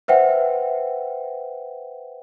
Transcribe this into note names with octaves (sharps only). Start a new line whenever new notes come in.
B4 C5 E5 F#5 G5